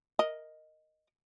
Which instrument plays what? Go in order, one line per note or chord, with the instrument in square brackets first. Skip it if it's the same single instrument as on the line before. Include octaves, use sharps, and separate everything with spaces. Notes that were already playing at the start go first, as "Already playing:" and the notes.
[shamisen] A#4 D#5